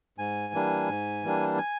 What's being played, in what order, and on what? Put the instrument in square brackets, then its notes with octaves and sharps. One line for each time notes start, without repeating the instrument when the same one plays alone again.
[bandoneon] G#2 G#5
E3 G3 A#3 D4
G#2
E3 G3 A#3 D4
G#5